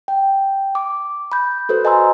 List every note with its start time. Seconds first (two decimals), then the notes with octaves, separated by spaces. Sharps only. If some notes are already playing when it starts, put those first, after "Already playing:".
0.08 G5
0.75 D6
1.32 B5 G6
1.69 F#4 A4 B4 C5
1.85 D#5 G#5 A#5 C6 E6